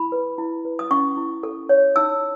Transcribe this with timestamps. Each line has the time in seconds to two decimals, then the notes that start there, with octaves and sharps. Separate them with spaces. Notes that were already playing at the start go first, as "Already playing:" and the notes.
Already playing: E4 B5
0.12 B4
0.38 E4
0.65 B4
0.79 D#6
0.91 C#4 C#6
1.17 E4
1.43 A4
1.69 C#5
1.96 D#4 E6